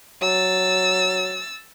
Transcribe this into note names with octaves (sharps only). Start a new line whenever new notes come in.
F#3 E6 A6